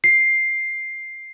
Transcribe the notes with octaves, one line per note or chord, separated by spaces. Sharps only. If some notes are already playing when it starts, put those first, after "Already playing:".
C7